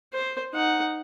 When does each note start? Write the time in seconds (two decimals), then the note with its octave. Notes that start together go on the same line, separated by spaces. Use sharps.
0.14 C5
0.54 D#4 F#5